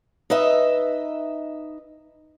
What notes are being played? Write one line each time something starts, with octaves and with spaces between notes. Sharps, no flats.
D#4 B4 D#5 E5